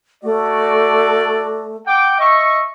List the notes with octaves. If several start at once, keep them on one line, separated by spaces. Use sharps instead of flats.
A3 F#4 D5
F#5 G5 D6
D#5 E5 C#6